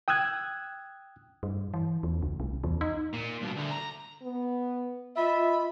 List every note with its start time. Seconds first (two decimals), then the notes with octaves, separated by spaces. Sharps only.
0.08 G5 D#6 E6 F#6 G#6
1.43 G2
1.74 E3
2.03 E2
2.23 C#2
2.40 C2
2.64 E2
2.81 D#4
3.13 A#2
3.41 G2 B2
3.56 D2 D3
3.71 A#5
4.22 B3
5.16 F4 D#5 E5 B5